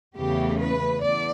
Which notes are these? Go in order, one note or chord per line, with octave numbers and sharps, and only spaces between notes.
E2 C#3 E3 A3 G4
B4
E2 D5